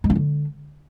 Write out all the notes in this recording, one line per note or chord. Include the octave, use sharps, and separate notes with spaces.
G#3
C#4
D3